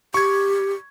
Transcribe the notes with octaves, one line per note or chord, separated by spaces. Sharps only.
G4 C#6 G#6